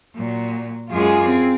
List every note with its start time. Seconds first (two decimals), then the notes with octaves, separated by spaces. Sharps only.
0.16 A#2 F#3
0.91 F#2 G#3 F4 G#4
1.24 C4